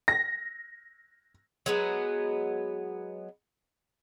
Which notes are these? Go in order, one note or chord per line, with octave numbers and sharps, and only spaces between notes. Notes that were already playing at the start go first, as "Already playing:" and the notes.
A#6
F#3 G#3 B3